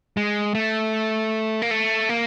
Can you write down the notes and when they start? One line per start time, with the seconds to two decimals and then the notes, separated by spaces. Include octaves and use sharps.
0.17 G#3
0.55 A3
1.62 A#3
1.71 A3
2.09 A#3